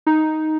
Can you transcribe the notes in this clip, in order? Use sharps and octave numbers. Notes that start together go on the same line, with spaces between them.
D#4